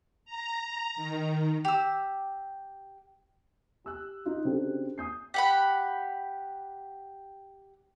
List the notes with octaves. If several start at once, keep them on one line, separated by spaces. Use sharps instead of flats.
A#5
D#3
G4 E6
G4 E6 F#6
D#4 F4
C#3 C4 D4 F#4 G4 A4
D#6 G6 C7
G4 F#5 B5